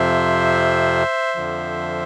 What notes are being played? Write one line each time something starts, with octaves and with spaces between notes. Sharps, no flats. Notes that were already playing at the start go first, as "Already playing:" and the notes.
Already playing: F2 C3 F3 C5 E5
F2 D3 F3